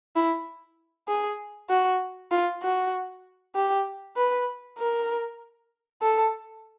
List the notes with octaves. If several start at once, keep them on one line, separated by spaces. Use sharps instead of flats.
E4
G#4
F#4
F4
F#4
G4
B4
A#4
A4